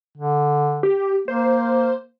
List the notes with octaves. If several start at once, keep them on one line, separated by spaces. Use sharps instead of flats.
D3
G4
A#3 C5